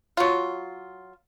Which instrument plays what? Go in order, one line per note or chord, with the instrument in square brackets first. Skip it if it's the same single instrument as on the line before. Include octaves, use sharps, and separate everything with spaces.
[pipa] F#3 F4